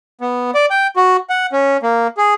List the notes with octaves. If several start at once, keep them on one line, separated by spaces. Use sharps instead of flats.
B3
D5
G5
F#4
F#5
C#4
A#3
G#4